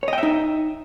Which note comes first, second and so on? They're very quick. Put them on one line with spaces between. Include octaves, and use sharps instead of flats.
C#5 D#5 G5 E5 D#4